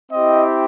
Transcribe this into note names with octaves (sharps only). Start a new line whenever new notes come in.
C4 E4 G4 D#5